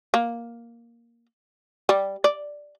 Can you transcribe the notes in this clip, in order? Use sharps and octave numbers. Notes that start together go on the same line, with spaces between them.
A#3
G3
D5